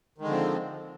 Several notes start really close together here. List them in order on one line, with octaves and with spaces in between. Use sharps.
D#3 G#3 D3 F3 C4